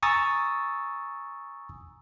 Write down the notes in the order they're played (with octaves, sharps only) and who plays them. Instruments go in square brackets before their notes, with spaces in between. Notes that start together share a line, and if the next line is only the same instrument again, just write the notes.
[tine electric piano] G#5 A#5 C#6 D#6 E6 A6